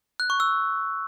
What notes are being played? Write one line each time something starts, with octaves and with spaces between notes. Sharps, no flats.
F#6
C#6
E6